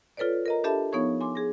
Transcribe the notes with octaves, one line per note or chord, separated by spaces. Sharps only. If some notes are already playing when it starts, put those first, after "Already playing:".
F4 A4 B4 C#5 D5
A#4 D#5 A#5
D4 G4 A4 E5 A5 B5
F3 B3 D#4 C#5 C#6 G#6
G#5 C6 D6
G#4 A#6